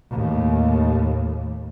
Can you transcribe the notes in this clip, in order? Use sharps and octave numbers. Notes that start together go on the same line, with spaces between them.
D#2 A2